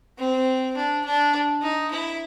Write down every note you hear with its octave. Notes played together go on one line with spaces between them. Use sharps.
C4
D4
D4
D#4
E4